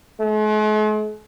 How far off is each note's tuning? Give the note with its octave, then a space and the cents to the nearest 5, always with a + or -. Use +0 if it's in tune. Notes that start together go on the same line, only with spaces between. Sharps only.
G#3 +45